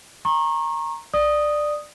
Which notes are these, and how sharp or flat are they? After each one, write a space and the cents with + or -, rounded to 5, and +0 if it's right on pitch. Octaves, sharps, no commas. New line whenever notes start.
A#5 +0 C#6 -30
D5 +15 D#6 +0